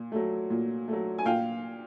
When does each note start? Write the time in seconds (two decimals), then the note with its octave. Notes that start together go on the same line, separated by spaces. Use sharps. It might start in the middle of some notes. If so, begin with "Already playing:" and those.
Already playing: A#2
0.12 F#3 A3
0.50 A#2
0.88 F#3 A3
1.18 G#5
1.25 A#2 F5 G5